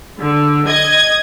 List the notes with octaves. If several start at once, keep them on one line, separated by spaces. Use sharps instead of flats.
D3
D#5 G#6